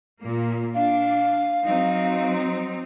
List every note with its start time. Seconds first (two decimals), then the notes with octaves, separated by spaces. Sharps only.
0.20 A#2 A#3
0.75 D4 F5
1.64 F#3 C4 D#4